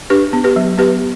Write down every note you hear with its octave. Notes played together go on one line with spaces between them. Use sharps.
D4 G4 B4
B3
G4 B4
F#3
B3 G4 B4